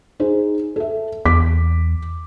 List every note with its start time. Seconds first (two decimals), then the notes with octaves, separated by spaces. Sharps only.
0.20 D#4 G#4 C5
0.76 A4 E5
1.25 E2 D6 B6